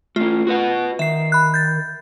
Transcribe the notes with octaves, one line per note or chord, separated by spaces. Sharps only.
A3 C#4 F4
F#4 B4 F#5
D#3 E5 C7
B5 F#6
G6 A6